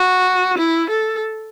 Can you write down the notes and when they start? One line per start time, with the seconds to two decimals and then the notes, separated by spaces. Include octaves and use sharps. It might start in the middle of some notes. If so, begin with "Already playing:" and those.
Already playing: F#4
0.58 E4
0.90 A4